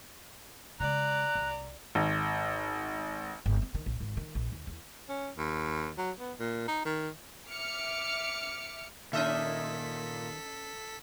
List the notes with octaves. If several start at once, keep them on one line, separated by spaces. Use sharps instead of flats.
C#3 G#3 D5 A#5 F#6
C2
G#1
G1
C4
D#3
A#1
G#1
D#3
A#1
D#2
E2
C#4
D#2
F#3
B3
A#2
D#4
D#3
E5 D6 F6 C#7
A#2 D#3 C#4 A4 D#5 E5 B6